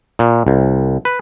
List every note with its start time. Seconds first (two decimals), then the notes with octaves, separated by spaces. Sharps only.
0.19 A#2
0.47 C2
1.05 B4